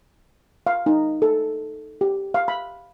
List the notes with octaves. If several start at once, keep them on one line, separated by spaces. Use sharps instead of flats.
F5
D#4
A4
G4
F5
B5